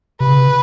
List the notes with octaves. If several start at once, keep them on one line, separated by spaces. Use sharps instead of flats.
C3 B4
C#3
C3